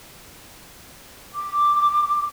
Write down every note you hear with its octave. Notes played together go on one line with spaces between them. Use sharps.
D6